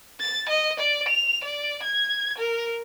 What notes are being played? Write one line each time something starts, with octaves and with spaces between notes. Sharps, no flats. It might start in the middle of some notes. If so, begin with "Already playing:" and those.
A6
D#5
D5
F7
D5
G#6
A#4